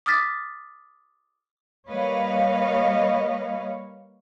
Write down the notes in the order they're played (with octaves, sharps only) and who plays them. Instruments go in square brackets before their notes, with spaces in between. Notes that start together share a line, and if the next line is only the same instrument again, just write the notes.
[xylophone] D6 D#6 F6 A6 B6
[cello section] G3 A#3 B4 C#5 D#5 F5